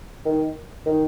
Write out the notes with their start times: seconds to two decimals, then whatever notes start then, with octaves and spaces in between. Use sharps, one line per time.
0.25 D#3
0.86 D#3